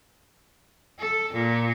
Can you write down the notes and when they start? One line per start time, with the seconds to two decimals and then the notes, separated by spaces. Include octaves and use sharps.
0.99 A4
1.33 A#2